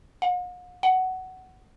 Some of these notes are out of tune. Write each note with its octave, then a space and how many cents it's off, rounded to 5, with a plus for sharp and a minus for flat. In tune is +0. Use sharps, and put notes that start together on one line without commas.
F#5 -45
F#5 +15